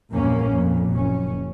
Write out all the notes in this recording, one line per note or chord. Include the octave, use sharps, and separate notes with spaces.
A#1 E2 G2 A#3 C#4
F2 A#2
F#1 C#4